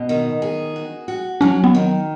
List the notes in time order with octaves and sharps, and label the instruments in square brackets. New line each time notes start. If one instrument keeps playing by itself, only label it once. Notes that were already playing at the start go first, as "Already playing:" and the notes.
Already playing: [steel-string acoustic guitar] B2
D#3
G#4
F#4
F#4
[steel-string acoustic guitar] F#3 [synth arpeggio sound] C#4
[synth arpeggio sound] B3
[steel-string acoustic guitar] D#3